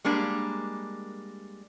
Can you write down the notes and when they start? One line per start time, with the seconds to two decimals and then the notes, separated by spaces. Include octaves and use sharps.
0.04 G3 G#3 A#3 D4